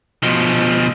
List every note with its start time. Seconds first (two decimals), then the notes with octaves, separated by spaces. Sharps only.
0.23 B2 F3